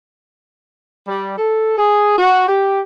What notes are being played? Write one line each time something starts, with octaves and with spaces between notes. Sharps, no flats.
G3
A4
G#4
F#4
G4